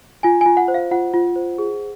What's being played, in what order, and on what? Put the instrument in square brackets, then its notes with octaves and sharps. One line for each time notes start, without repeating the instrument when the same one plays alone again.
[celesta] F4 G#5
F4 G#5
F#5
C5
F5
F4 F#5
F4
C5
G#4